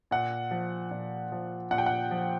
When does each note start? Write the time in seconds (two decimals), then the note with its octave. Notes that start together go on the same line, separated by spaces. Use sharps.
0.11 A#2 F#5
0.51 F3
0.91 A#2
1.32 F3
1.71 A#2 F#5
1.78 G5
1.86 F#5
2.11 F3